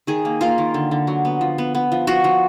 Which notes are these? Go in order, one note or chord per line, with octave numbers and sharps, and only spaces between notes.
D#3 G#4
A#3
A#3 F4
D#3
D3
D3
F#3
B3
F3
B3
B3
F3
F3 F#4
F3